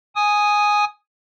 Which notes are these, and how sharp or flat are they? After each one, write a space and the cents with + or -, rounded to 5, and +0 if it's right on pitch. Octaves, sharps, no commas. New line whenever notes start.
G#5 +0 D#6 +0